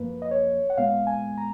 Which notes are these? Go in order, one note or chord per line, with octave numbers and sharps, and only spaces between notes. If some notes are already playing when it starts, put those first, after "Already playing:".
Already playing: F#2 F3 A#3 B4
D#5
C#5
F#5
A#2 G#3 B3 F5
G#5
A#5